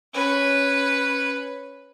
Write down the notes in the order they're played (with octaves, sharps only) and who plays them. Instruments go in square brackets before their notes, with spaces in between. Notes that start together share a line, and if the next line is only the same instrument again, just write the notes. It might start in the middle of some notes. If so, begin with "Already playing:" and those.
[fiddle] C#4 B4